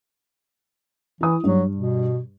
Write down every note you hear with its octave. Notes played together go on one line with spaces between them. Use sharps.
E3 E4 D#6
G2 F#3
B2